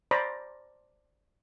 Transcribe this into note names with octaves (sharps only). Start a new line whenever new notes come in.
C5 D5 A#5 B5